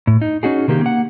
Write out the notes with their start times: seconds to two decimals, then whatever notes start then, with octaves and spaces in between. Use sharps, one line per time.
0.07 A2
0.21 D#4
0.43 C#4 D#4 F#4 G#4
0.68 C3 D#3 A#3 G4
0.81 A#3 F#5